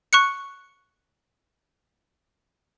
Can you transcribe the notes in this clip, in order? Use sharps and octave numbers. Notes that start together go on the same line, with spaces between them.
C#6 F#6 C#7